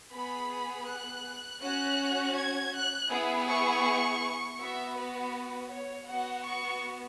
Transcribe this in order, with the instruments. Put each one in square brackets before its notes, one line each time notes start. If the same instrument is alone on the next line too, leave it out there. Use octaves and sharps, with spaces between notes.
[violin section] B3 G#4 B5
F#6
C#4 F#4 F#6
G#6
F#6
B3 E4 G#4
C#6
B3 F#4 E5
B4
C#5
B3 F#4 F#5
C#6